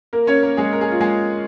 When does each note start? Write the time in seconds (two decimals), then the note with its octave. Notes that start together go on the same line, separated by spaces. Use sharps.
0.13 A#3 A#4
0.27 C#4 C#5
0.43 A#3 A#4
0.57 G#3 G#4
0.73 A#4
0.81 G#4
0.91 F4
1.01 G#3 G#4